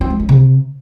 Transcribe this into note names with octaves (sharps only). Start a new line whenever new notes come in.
C4
G#3
C#4
C3